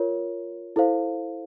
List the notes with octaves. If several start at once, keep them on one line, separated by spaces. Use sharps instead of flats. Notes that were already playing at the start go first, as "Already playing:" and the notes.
Already playing: F4 A#4 C#5
E4 A4 C5 F5